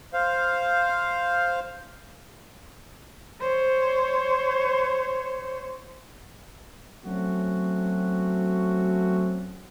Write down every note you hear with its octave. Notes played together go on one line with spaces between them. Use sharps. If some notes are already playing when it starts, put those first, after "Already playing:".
C5 F5
C5 C#5
F#3 A3 C4 C#4 F#4